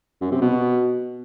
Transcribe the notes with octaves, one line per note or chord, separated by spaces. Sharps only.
F#2
C3
B2